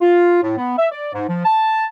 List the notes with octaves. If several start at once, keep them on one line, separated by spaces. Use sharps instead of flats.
F4
A2
B3
E5
D5
G#2
F3
A5